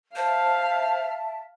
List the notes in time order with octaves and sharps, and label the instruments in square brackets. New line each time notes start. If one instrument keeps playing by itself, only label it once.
[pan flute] C5 [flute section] E5 A5 [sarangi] F5